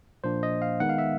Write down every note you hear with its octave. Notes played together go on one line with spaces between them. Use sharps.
A#2 F3 A#3 D4 C5
D#5
F5
D#3 G#3 B3 D#4 F#5
F5
E5